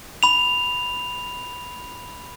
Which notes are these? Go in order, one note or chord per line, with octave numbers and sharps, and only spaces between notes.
B5 F7